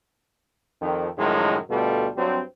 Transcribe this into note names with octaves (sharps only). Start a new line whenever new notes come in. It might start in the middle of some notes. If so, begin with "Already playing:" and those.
F2 D#3
F#2 A2 D#3 F3 G#3
D2 B2 G3 F4 A4
G2 F#3 G3 C4